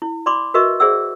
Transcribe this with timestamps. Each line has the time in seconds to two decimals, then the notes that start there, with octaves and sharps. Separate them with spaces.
0.02 E4
0.26 D5 B5 C6 D6
0.54 F#4 A#4 B4 D#5 E5 C#6
0.80 G#4 C5 D5 E5 F#5 E6